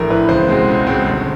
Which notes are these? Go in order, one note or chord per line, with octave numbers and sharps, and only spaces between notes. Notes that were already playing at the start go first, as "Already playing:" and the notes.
Already playing: A#1 A2 E3 A#4
A2 E3 B4
C#2 C5
B2 G#3 C4
C#2
B2 G#3 C4
G1